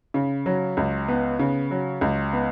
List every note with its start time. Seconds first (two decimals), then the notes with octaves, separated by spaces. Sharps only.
0.14 C#3
0.46 F#3
0.77 C#2
1.08 B3
1.39 C#3
1.71 F#3
2.01 C#2
2.33 B3